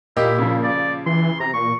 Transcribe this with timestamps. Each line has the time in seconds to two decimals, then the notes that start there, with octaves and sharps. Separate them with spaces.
0.17 A#2 A#3 E4 G4 D#5
0.39 C#3 F3
0.63 D5
1.06 E3 C6
1.40 C3 A#5
1.53 A#2 C#6